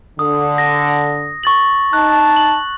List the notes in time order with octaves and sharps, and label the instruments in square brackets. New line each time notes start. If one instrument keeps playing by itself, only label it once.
[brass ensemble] D3 [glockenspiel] D#6
[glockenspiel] A#6
C#6 A6 F#7
[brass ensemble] D#4 A5 [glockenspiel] F#6
[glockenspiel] F#7